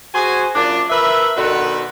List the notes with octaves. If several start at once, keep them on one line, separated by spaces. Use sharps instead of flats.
F#4 G#4 C5 G#5
F#2 A#2 D4
A#4 B4 E5
B2 D3 D#3 F#4 B4